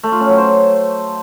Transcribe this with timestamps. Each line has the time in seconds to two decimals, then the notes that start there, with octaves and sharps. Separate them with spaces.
0.03 A3
0.12 F4
0.21 C#4
0.29 F#3
0.38 C5